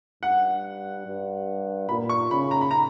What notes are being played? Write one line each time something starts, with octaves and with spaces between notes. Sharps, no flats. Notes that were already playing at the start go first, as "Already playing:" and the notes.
G2 F#5
G2
A#2 B5
C#6
C#3 B5
A#5
B5
A#5